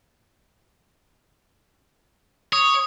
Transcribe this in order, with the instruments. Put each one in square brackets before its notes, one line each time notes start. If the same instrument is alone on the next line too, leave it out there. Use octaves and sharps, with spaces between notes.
[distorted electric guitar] C#5 [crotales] D#6